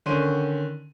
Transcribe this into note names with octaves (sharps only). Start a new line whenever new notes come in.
D3 D#3 C#4 C6 D#7